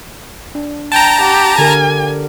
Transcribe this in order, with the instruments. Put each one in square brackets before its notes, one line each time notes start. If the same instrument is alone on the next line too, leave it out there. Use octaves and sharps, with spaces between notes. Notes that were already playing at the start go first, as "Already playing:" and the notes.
[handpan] D4
[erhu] G5 [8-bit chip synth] A5 A#5
[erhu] G4 [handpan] F#5
[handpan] D3 G4 A#4 [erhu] G#5